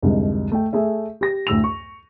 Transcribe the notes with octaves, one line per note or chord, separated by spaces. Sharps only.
C2 F2 G#2 D3
A3 G5
A3 G#4 E5
G4 A#6
D2 A2 E6 F7
C#6